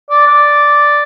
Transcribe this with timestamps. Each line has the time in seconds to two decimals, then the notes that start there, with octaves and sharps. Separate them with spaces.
0.10 D5
0.27 D5